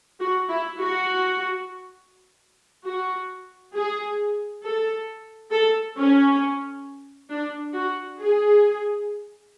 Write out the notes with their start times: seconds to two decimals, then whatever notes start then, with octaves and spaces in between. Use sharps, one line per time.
0.20 F#4
0.49 E4
0.79 F#4
2.85 F#4
3.75 G#4
4.64 A4
5.51 A4
5.97 C#4
7.29 D4
7.73 F#4
8.19 G#4